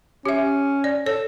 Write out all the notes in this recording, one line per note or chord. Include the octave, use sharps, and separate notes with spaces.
C#4 G4 E5
D5
A4 C#5